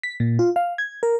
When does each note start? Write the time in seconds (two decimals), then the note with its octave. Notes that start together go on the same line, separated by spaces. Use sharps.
0.03 B6
0.20 A#2
0.39 F4
0.56 F5
0.78 G#6
1.03 A#4